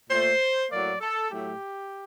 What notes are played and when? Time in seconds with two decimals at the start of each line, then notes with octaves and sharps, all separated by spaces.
0.10 A#2 A3 C5
0.70 A2 F#3 A#3 D5
1.01 A4
1.30 A2 F#3 A3 G4